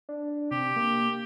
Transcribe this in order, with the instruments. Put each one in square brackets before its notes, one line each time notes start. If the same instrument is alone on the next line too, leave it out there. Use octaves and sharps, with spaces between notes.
[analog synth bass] D4
[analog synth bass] C3 [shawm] G4
[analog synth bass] A#3